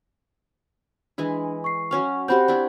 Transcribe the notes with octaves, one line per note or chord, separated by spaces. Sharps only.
E3 G#3 D4 E4
C#6 C7
F#3 C#4 F5 C#6
C4 F#4 G4 C5 B5 G6
D4 E4